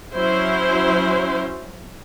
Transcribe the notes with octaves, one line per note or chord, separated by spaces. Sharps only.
F#3 C#4 E4 C5